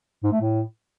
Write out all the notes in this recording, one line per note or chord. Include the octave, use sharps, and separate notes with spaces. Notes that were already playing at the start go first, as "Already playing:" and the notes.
G#2
A3
A2